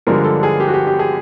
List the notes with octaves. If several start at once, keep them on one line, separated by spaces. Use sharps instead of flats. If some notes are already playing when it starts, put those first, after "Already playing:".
G2 D3 F3 G#3 A#4
A4
G#4
G4
F#4
G4
G4
G#4